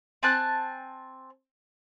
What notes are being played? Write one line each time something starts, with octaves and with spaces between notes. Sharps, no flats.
C4 G#5 A5 F#6